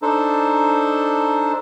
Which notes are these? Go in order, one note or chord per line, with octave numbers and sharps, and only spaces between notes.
D4 D#4 A4 C5